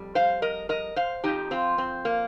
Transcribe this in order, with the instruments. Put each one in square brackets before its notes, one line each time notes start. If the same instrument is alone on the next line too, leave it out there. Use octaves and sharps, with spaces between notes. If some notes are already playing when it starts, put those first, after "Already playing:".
Already playing: [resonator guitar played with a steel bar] F2 G3
C5 F5
A#4 D#5
A#4 D#5
C5 F5
F2 F3 D#4 G4
C4 F4
C4
A#3